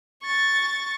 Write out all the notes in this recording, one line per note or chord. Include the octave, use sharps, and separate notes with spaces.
C#6 A6